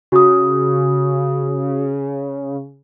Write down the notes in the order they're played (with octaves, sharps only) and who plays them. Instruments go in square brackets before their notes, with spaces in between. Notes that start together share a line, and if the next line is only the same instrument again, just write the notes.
[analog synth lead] C#3 [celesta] F#4 D#6